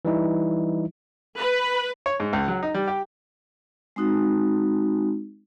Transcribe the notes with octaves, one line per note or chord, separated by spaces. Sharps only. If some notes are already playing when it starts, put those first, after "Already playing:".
E3 G3 D#4 E4
B4
C#5
G#2
C#2
F#3
D#4
G3
G4
G#3 C4 D#4 F#4